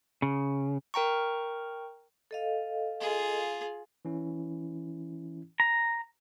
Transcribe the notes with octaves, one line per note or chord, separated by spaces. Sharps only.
C#3
A#4 G5 A#5 C#6
A4 D#5 F5
F4 G#4
E3 C#4 E4
A#5